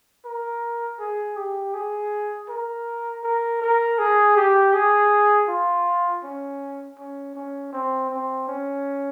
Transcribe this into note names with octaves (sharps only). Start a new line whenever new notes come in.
A#4
G#4
G4
G#4
A#4
A#4
A#4
G#4
G4
G#4
F4
C#4
C#4
C#4
C4
C4
C#4